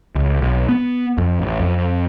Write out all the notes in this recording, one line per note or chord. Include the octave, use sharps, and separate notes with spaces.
C#2
B1
B3
F2
A1
F2